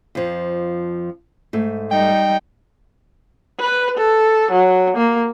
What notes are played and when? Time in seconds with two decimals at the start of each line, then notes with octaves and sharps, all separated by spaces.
0.15 F2 F3
1.53 G#2 A3
1.91 G3 D#4 G5
3.60 B4
3.98 A4
4.52 F#3
4.97 A#3